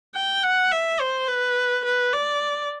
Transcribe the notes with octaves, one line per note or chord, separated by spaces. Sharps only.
G5
F#5
E5
C5
B4
B4
D5